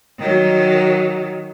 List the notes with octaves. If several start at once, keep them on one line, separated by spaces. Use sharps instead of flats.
D#3 F#3